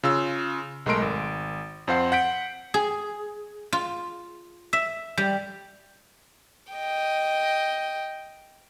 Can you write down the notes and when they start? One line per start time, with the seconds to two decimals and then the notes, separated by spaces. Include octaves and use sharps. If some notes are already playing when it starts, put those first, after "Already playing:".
0.03 C#3 F4 E6
0.86 B1 G#3 A3 A#4 C6 D7
1.02 G#1
1.88 F2 C4 C5 F5 F#5 C7
2.12 F#5 G6 B6 D7
2.74 G#4
3.73 F4
4.73 E5
5.17 G3
6.73 D#5 G5